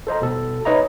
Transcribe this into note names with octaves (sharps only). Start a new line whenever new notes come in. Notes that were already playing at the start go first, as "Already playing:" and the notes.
A4 C5 D#5 A#5
B2 A4
D#4 B4 C#5 D#5 E5 A#5